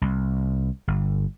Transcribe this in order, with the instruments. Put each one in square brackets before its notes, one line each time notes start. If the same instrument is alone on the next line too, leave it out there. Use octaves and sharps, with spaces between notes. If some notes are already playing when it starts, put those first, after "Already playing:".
[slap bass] C2
G1